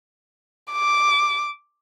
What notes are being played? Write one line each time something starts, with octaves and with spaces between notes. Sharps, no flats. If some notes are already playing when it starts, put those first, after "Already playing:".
D6